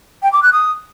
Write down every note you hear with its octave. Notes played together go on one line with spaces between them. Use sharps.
G5
D6
F#6
D#6